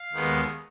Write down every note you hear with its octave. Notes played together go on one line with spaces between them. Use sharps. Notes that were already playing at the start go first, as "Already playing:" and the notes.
Already playing: F5
D#2 D#3 G#3 B3